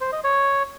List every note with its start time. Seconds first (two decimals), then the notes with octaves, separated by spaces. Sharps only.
0.01 C5
0.12 D#5
0.24 C#5